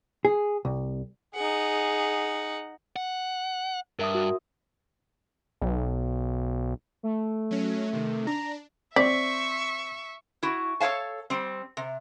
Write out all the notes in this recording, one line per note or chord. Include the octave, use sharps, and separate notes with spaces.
G#4
C2
D#4 G#4 F#5
F#5
G2 A#4 E5 D#6
F#4
B1
A3
F#3 C#4
C3 D#3
D4 A#5
C4 D5 E5 C#6 B6
E4 F#4
A4 B4 C#5 F5 A5
G3 C4
C3